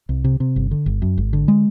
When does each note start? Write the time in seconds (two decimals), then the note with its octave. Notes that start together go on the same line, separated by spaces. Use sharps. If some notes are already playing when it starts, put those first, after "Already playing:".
0.09 C2
0.24 C3
0.40 C3
0.56 G1
0.71 D3
0.86 G1
1.02 F#2
1.17 G#1
1.33 D3
1.48 G#3